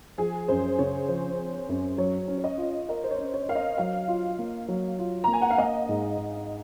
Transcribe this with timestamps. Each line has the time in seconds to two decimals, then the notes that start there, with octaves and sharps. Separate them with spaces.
0.18 F3 G#4
0.48 F#2 C5
0.79 C#3 C#5
1.09 F3 C5
1.39 C4
1.69 F#2
1.98 F#3 C#5
2.28 C#4
2.38 C#5
2.44 D#5
2.58 F4
2.89 A#4 D#5
3.04 C5
3.11 C#5
3.18 C#4
3.34 C#5
3.49 A#4 F5
3.55 D#5
3.78 F#3 F5
4.08 F4
4.39 A#3
4.68 F#3
4.99 F4
5.24 A#5
5.28 A#3
5.33 G#5
5.42 F#5
5.50 F5
5.58 A#3 D#5
5.89 G#2
6.18 G#2